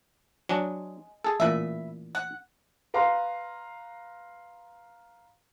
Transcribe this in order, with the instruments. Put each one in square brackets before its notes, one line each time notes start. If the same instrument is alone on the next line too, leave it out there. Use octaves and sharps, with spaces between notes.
[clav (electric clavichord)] F#3 D4 [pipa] G#3
[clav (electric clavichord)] G#4 A4
[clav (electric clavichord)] A1 A#2 [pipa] B4 E5
[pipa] F#5
[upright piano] B4 F5 A#5 C6